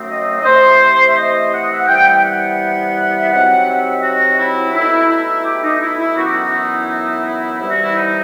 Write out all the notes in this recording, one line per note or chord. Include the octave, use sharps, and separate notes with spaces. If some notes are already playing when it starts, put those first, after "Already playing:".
Already playing: F#2 F#3 A3 C4 D#4
D#5
D#5
C3 E3 A3 C5
E5
D#5
F#5
D#5
E5
F#5
C3 E3 G3 B3 G5
G5
F#5
E5
C3 F#3 C4 D#4 F#5
E5
F#4
E4
B2 A3 D#4 E4
E4
G4
D#4
E4
E4
F#2 E3 B3 D#4 F#4
G4
F#4
E4
C3 E3 G3 E4
F#4
E4
D#4